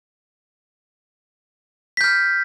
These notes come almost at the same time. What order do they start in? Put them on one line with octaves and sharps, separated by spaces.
B6 G6 F6